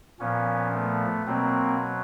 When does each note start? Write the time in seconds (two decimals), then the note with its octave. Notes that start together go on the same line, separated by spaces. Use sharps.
0.20 A#2 F3 B3 C#4
0.74 A3 B3
1.27 B2 F#3 A#3 C4